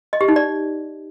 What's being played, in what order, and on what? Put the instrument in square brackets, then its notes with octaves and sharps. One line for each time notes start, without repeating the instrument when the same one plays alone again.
[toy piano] D#5
G4
D#4
D5